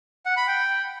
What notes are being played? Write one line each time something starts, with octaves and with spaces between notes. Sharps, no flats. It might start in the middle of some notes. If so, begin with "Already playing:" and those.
F#5
B5
G5